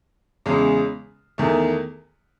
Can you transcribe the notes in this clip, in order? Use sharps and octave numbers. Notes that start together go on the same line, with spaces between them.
E2 C#3 G#3
E2 D#3 A3